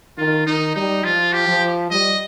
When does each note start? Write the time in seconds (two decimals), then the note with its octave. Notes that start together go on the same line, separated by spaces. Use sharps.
0.18 D#3 F4
0.46 D#3 D#4
0.76 G3 D#4
1.04 F3 F4
1.33 G4
1.48 F3
1.91 G3 D#5